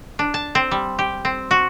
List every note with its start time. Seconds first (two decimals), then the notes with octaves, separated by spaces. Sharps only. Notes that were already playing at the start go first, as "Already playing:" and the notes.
0.19 D4
0.34 A5
0.55 C4
0.71 G3
0.99 G4
1.25 C4
1.51 F#4